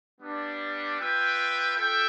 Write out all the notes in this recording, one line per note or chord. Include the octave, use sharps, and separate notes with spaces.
G3 B3 D4
F4 B4 E5 G5
F4 A4 E5 G5